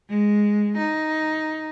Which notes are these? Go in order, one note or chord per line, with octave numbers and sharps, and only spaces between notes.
G#3
D#4